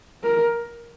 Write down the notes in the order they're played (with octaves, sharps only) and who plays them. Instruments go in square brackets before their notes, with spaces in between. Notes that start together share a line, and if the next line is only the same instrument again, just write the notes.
[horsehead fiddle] A#4